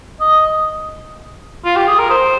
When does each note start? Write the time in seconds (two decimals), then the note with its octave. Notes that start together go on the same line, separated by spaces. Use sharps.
0.21 D#5
1.65 F4
1.76 G4
1.88 G#4
1.99 A#4
2.10 C5